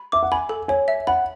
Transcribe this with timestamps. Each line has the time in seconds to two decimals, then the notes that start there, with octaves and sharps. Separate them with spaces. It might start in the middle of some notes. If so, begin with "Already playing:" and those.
Already playing: B5
0.12 E5 D6
0.23 F#5
0.32 G#5 B5
0.49 A4
0.68 C#5 G#5
0.88 E5
1.07 F#5 B5